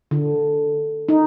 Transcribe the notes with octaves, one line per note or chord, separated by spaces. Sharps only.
D3
D#4